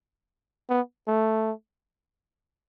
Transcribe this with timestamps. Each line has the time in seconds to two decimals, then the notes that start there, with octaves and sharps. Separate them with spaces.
0.69 B3
1.07 A3